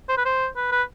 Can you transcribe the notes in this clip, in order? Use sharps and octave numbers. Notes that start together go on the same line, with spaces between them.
C5
B4
C5
B4
B4